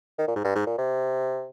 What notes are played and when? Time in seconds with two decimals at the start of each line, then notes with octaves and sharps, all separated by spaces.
0.19 D#3
0.27 A#2
0.36 G#2
0.44 G2
0.55 G#2
0.66 A#2
0.78 C3